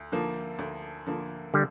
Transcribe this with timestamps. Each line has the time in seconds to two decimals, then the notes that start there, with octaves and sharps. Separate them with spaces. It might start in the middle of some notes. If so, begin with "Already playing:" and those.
Already playing: D2
0.12 D3 F3 A#3
0.59 D2
1.07 D3 F3 A#3
1.54 D3 G3